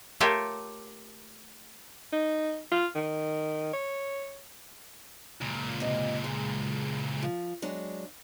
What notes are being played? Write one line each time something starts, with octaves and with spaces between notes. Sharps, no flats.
A3 F4 G4 A4 A#4 C#5
D#4
F4
D#3
C#5
C#2 A#2
C3 D#5
G#3
F3
F#3 G#3 D4